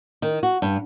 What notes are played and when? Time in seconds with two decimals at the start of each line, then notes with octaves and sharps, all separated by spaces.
0.22 D#3
0.43 F#4
0.62 G2